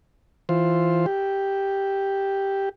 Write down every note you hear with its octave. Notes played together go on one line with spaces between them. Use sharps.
E3 F4 C5
G4